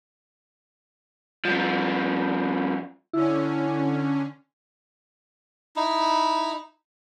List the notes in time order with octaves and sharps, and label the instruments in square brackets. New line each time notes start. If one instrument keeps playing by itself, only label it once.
[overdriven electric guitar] G2 F3
[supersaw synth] D3 C#4 [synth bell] E4
[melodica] D#4 E4